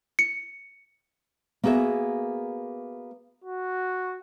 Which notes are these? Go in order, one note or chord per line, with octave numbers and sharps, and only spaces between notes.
C#7
A#3 B3 F#4 G#4 E5
F#4